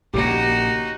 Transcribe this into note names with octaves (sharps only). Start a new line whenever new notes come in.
A#1 C#3 A#3 D#4 F#4 G4